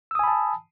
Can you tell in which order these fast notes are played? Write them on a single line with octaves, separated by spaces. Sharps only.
E6 D#6 G#5 B5 A5